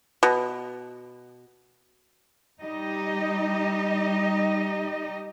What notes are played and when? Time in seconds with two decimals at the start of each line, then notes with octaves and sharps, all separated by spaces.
0.23 B2
2.61 G3 D#4 G4 D#5